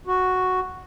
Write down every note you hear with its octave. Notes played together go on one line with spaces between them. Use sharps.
F#4